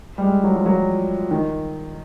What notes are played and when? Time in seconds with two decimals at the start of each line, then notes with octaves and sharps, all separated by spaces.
0.18 G3
0.22 G#3
0.44 F#3
0.55 F3
0.66 F#3
1.31 D#3